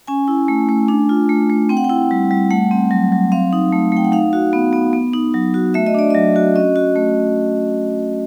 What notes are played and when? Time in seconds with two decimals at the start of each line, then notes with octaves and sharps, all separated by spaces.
0.07 C#4 G#5
0.28 E4
0.48 A3
0.69 A3
0.88 D4
1.09 F4
1.29 A3
1.50 A3
1.69 C4 G5
1.77 F#5
1.84 G5
1.90 E4
2.11 G3
2.31 G3
2.51 A3 F#5
2.71 C4
2.91 F#3
3.12 F#3
3.32 C4 F5
3.53 D#4
3.73 A3
3.92 A3 G5
4.05 F#5
4.12 D#4 F5
4.33 F#4
4.53 B3
4.73 B3
4.93 B3
5.13 D#4
5.34 F#3
5.54 F#4
5.74 A3 E5
5.86 D#5
5.94 D4 D5
6.10 F#3 D#5
6.36 F#4
6.56 C#4 D#5
6.76 F#4
6.96 A3